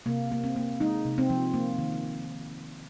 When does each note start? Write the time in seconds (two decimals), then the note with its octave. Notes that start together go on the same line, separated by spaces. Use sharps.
0.06 C3 A#3
0.32 A#3
0.44 C4
0.56 A#3
0.80 G#3 D#4
1.05 C3
1.18 C4
1.30 F3
1.54 A#3
1.78 D#3